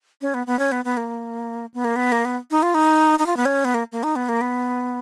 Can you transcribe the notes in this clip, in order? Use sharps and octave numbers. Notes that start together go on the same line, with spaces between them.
C#4
B3
B3
C#4
B3
B3
A#3
B3
A#3
B3
A#3
B3
D#4
F4
D#4
D#4
F4
B3
C#4
B3
A#3
A#3
D#4
B3
A#3
B3